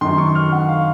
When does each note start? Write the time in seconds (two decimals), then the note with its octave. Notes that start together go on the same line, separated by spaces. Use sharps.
0.01 F#2 D#3 C6
0.18 C#6
0.35 F6
0.52 F#5
0.68 F5